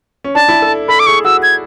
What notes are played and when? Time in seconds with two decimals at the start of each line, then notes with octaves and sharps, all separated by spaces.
0.24 C#4
0.35 D4 A5
0.49 E4
0.62 A4
0.88 A4 B5
1.00 D6
1.07 G#4 C#6
1.24 F#4 E6
1.43 G#6